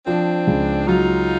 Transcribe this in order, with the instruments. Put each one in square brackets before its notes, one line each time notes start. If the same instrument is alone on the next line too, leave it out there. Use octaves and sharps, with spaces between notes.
[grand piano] F3 [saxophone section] C4 D4
[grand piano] C#2
[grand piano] F#3 [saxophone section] D#4 F4